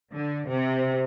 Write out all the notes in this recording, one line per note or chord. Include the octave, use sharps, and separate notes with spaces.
D3
C3